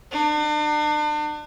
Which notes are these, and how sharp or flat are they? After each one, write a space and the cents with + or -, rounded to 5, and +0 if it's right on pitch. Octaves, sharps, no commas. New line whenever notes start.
D4 +40